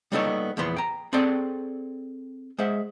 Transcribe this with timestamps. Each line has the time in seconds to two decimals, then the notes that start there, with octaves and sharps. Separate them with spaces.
0.12 G3 A#3 B3 D#4 A4 C#5
0.57 E2 A#2 F3 B3 C6
0.76 G5 A#5
1.13 C4 G#4 A4 D5 G5
2.58 G#3 C5 E5 F#5